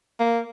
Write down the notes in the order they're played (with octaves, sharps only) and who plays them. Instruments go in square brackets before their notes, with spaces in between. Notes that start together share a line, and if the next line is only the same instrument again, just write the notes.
[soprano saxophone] A#3